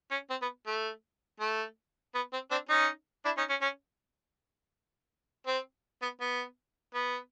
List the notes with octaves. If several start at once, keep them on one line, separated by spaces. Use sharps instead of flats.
C#4
C4
B3
A3
A3
B3
C4
C4 D4
C#4 D#4
D4 E4
C#4 D#4
C#4
C#4
C4
B3
B3
B3